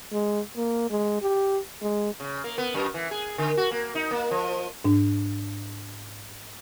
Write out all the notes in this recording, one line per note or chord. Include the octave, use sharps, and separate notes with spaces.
G#3
A#3
G#3
G4
G#3
C#3
A#3
B3
F#2
E3
G#4
D3
F#4
A#3
D#4
A#3
F3
G#2 D4